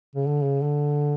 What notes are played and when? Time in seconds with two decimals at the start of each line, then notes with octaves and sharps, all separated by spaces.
0.15 C#3
0.27 D3
0.44 C#3
0.62 D3